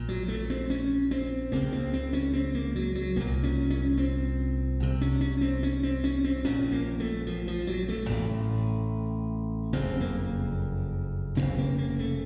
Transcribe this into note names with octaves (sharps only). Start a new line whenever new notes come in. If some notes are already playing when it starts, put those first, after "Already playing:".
Already playing: A#1 A#2
F#3
A3
C4
C#4
C4
C#2 C#3 A#3
C4
C4
C#4
C4
A#3
F#3
F#3
C2 A#2 A#3
C#4
C#4
C4
C2 C3
C#4
C#4
C4
C#4
C4
C#4
C4
A#1 A#2 C#4
A#3
A3
F3
F3
F#3
A3
A1 A2
F#1 F2 C#3 C4
A#3
F1 D#2 C#3 C4
A#3
A#3
A3